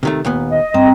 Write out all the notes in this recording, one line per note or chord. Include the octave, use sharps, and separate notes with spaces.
C3 D#3 A3
D#2 A#2 B3
D#5
G2 C4 G5 A#5